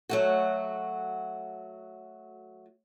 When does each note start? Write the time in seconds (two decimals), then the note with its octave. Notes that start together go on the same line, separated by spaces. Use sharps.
0.09 F#3 A3 F#4